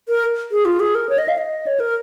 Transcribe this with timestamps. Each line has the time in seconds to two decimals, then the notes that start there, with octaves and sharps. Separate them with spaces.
0.09 A#4
0.52 G#4
0.65 F4
0.80 G#4
0.95 A#4
1.09 C#5
1.18 D#5
1.28 F5
1.38 D#5
1.67 C#5
1.80 A#4